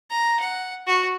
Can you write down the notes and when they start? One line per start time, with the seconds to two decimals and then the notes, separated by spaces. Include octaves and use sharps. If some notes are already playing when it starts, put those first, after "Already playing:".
0.10 A#5
0.40 F#5
0.87 F#4